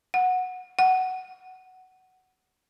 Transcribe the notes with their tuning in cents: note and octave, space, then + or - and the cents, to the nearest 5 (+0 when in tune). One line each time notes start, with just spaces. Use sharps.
F#5 -10
F#5 +10